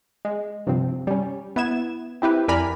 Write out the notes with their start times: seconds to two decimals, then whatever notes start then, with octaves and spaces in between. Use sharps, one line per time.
0.25 G#3
0.67 G2 C3 F3 C4
1.07 G3 C#4
1.56 B3 E4 G#6 E7
2.22 C4 E4 G4 B4
2.48 F2 A#4 D5 G#5 B5 F6